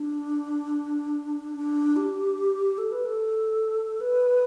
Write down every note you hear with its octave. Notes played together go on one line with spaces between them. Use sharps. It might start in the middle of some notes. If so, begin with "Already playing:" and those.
Already playing: D4
D4
G4
A4
B4
A4
B4